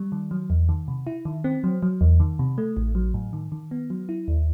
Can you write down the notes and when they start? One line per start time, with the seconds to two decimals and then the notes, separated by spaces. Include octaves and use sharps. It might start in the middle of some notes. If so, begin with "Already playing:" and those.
Already playing: G3
0.12 D#3
0.31 F#3
0.50 E2
0.69 D#3
0.88 C3
1.07 E4
1.25 D#3
1.44 C4
1.64 F#3
1.83 F#3
2.01 E2
2.20 D#3
2.39 C3
2.58 A3
2.77 A1
2.95 F#3
3.14 A2
3.33 D#3
3.52 D#3
3.71 B3
3.90 F#3
4.09 E4
4.28 D#2